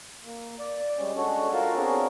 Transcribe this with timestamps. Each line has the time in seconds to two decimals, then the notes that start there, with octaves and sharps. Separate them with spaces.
0.24 A#3
0.59 D5
0.98 G3 G#3 C#4
1.17 G#3 C#4 D4 F#4 A4 C#5
1.53 F4 F#4 A4 A#4 F5 A5
1.76 B3 C4 D4 G#4 A#4 C#5